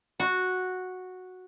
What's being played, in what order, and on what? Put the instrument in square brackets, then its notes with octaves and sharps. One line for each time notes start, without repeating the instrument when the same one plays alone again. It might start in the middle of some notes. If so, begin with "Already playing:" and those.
[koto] F#4